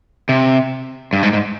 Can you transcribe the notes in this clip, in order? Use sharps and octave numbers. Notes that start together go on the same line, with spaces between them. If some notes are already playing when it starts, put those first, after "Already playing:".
C3
G2
G#2
G#2